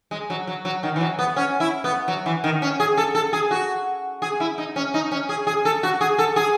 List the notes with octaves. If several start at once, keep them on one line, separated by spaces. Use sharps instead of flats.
G#3
F#3
F#3
F#3
D#3
E3
F#3
B3
C#4
E4
B3
F#3
E3
D#3
C#4
G#4
A4
A4
G#4
F#4
G#4
E4
D#4
C#4
D#4
C#4
G#4
G#4
A4
F#4
G#4
A4
G#4